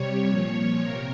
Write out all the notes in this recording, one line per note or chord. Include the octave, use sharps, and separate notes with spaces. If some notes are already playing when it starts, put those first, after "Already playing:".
Already playing: C3 G3 C#5
A#2 F3
C3 A#4